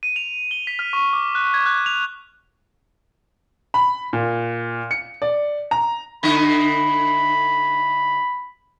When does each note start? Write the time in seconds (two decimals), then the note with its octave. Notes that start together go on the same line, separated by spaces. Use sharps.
0.03 D#7
0.16 F7
0.51 G7
0.67 B6
0.79 F6
0.93 C#6
1.13 D6
1.35 F#6
1.54 G#6
1.66 F#6
1.86 F7
3.74 B5
4.13 A#2
4.91 C#7
5.22 D5
5.71 A#5
6.23 D3 D#4 E4 B5